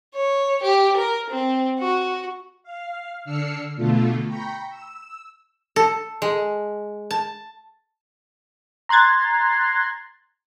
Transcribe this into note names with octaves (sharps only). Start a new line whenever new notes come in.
C#5
G4
A#4
C4
F#4
F5
D3 D4 E6 F6 C7 C#7
B2 D3 A3 F4 A4
G5 A#5 B5 C#6
E6
A4
G#3
A5
A#5 C6 F#6 G#6 A6